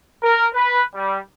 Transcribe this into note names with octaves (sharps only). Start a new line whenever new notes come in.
A#4
B4
G3